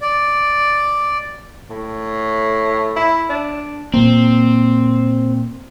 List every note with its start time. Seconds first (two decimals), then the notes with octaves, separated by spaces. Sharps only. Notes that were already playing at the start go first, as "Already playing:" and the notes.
0.01 D5
1.70 A2
2.96 E4
3.29 D4
3.94 A#2 A#3 C4